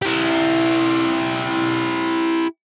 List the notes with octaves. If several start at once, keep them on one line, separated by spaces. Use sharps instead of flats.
E4 G4